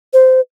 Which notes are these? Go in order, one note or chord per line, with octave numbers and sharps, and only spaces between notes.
C5